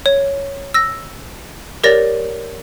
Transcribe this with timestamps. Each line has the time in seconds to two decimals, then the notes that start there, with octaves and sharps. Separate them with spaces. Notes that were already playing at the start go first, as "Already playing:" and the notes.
0.06 C#5
0.74 E6 A#6
1.83 G4 A#4 C#5 D5 A6 A#6